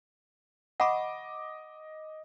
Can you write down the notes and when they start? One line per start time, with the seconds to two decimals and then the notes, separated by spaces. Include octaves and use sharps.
0.80 D#5 F#5 B5 C#6 D6